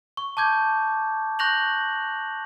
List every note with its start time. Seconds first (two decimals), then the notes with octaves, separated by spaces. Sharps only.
0.17 C#6
0.37 A5 D6 G6 G#6
1.39 C#6 F#6 G6 A#6 F7 F#7